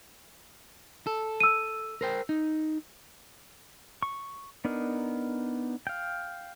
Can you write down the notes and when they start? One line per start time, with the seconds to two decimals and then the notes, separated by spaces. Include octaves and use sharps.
1.07 A4
1.40 E6 D#7
2.01 A#4 C5 G5
2.29 D#4
4.03 C#6
4.65 B3 D4 D#4 A#4
5.87 F5 G5